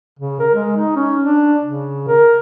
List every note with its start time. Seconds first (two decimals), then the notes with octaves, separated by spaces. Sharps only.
0.19 C#3
0.39 A#4
0.55 G#3
0.77 D#4
0.96 C#4
1.22 D4
1.64 C#3
2.08 A#4